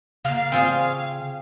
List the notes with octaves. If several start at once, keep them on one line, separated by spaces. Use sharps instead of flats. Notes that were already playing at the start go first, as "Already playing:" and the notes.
C#3 A#3 F4 F5
C4 F4 G#4 G#5 C#6